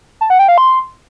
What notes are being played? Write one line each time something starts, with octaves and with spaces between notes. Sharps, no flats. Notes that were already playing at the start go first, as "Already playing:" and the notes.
A5
F#5
G5
F5
C6